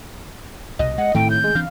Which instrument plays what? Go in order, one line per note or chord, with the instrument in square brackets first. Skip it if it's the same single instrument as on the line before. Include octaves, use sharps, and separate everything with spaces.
[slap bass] C2 B2 [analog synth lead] D#5
[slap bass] G#3 [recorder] F#5
[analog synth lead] A2 [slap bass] D#3 A3 C4 [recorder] G5
[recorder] G6
[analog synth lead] G#3
[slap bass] E3 C4 D4 [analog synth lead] F5